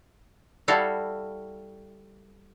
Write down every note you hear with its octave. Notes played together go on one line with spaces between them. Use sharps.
G3 E4 F#4 A4 F5